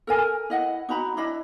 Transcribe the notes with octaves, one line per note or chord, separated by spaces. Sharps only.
A4 A#4 G#5
E4 D#5 F#5
D#4 F#4 A#5 B5
D4 E4 D#5 B5